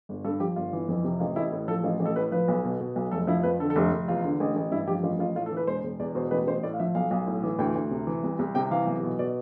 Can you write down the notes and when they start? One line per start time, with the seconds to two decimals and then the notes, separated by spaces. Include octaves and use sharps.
0.09 G1
0.25 G2 A4
0.40 F3 G4
0.56 G1 F4
0.73 E3
0.89 F2
1.04 C3
1.20 A1 F4
1.36 A1 E4
1.52 A2
1.68 F3 A4
1.84 A1 F4
2.00 A1
2.05 A4
2.16 A2 B4
2.32 F3 B4
2.48 B1
2.64 B2
2.80 B2
2.96 B1
3.11 F1 A4
3.27 F3 E4
3.43 F2 B4
3.59 D3 A4
3.70 A4
3.75 F1 G4
3.92 F1
4.08 E2 F4
4.24 D3
4.40 A1
4.56 A1
4.71 G2 E4
4.87 F3 G4
5.03 A1 F4
5.19 A1 F4
5.36 A2 F4
5.46 A4
5.52 E3 B4
5.67 E1 C5
5.83 E1
5.99 E2 D5
6.15 B2 C5
6.31 A1 B4
6.47 A1 C5
6.63 A2 D5
6.74 F5
6.79 F3 E5
6.95 B1 F5
7.11 B1
7.27 A2
7.44 E3
7.59 D2 G5
7.75 D2
7.91 C3
8.07 E3
8.23 C2
8.39 C2
8.55 C3 G5
8.71 E3 F5
8.87 B1
9.03 B2
9.19 B2 D5